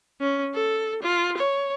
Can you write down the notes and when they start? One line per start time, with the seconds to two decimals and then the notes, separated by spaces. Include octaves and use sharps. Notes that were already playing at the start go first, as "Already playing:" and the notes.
0.21 C#4
0.54 A4
1.03 F4
1.38 C#5